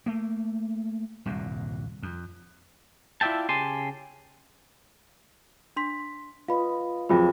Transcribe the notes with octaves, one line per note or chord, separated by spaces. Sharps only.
A3 A#3
D#1 C2 G2 A#2
F2
E4 F4 D5 E5 G5 A5
C#3 G4 G#5 A5 C6
D4 C6 B6
F4 B4 D#5 F5 B5
F2 F#3 F4 G#4 B5